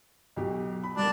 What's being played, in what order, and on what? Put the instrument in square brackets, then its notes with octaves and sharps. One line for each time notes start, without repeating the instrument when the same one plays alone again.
[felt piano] B1 F#3 G4
B5
[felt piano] G3 A#4 [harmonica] D4